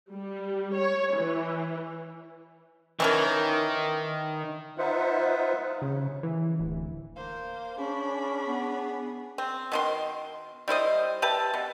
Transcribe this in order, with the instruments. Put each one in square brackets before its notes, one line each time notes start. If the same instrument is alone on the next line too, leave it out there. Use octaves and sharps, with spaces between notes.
[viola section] G3
C#5
E3
[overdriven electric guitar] D#3 [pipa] E3 C#4 A#4
[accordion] D#4 F4 B4 C5 E5 F#5
[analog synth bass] C#3
E3
D1
[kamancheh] A#3 C5 [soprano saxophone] F5
[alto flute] C#4 [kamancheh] D4 B5 [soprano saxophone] G#4
[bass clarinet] B3
[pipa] C4
B2 D#3 C6
G3 E4 C5 D#5
G4 B4 E5 A5
B2